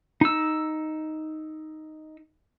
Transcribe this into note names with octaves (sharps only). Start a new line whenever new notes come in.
D#4 E6